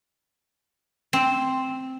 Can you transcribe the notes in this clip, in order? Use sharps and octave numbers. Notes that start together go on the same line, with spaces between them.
C4